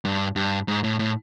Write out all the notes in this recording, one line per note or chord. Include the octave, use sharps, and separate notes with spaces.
G2
G2
G#2
A2
A2